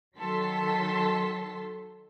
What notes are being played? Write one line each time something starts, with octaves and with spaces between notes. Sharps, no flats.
D#3 F#3 A4 A5 C6 B6